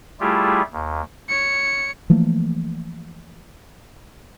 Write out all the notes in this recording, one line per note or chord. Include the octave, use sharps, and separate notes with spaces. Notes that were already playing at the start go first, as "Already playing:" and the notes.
G3 A3 E4 F4 G4 G#4
D#2
C#5 C#7
E3 F3 A3 A#3